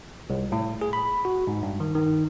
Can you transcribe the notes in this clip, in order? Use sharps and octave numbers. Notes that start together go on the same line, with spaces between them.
C2
A2
G#4
B5
F#4
G#2
G2
D#3
D#3